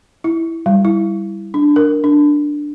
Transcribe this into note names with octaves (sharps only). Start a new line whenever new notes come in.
E4
G3
E4
D4
A#4
D4